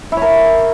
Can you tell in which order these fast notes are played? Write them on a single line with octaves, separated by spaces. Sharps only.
E4 C#5 A#4